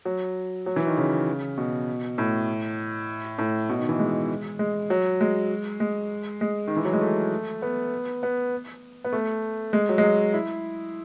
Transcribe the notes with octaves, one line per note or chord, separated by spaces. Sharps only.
F#3
F#3
E3
D#3
C#3
B2
A2
A2
B2
D#3
E3
G#3
G#3
F#3
G#3
G#3
G#3
D#3
E3
F#3
G#3
A3
B3
B3
B3
A3
G#3
F#3
G#3
F#3
E4